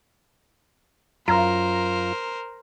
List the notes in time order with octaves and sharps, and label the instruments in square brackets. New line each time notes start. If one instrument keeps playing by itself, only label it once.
[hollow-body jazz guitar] F#2 [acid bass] F4 [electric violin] A#4 C5 [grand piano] A#5